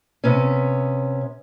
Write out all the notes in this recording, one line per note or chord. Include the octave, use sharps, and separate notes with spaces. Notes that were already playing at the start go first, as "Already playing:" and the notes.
C3 B3 C#4